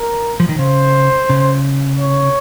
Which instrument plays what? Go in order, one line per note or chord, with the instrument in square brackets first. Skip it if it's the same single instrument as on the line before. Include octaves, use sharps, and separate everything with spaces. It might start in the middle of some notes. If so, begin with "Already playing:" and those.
Already playing: [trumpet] A#4
[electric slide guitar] F3
D#3
[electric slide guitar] C#3 [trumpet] C5
[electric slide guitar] C#3
[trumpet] C#5